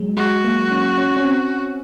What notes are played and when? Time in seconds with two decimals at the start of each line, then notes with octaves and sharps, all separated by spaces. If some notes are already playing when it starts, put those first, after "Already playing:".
Already playing: F#3 G#3
0.17 G#3 F#4
0.44 A#3
0.71 C#4
0.98 C#4
1.17 C#4
1.24 C4